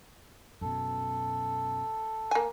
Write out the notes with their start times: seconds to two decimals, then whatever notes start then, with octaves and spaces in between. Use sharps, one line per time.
0.61 F#2 B2 A4
2.31 A#3 G#5